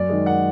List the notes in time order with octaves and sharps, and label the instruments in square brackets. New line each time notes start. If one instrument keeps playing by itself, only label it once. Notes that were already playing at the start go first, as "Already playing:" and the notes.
Already playing: [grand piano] F#2 D5
D#3 G#3
F#5